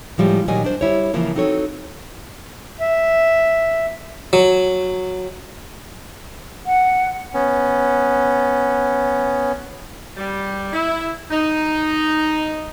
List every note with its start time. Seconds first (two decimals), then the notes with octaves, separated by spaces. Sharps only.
0.18 A2 F3 G3 G#3
0.48 A#2 D#3 F#3 G3 D#5 G#5
0.64 D4 C5
0.81 G3 E4 C#5
1.14 C#3 E3 F3 A#3 F4
1.35 C4 D#4 F#4 A4 C#5
2.80 E5
4.33 F#3
6.66 F#5
7.34 B3 C#4
10.17 G3
10.73 E4
11.31 D#4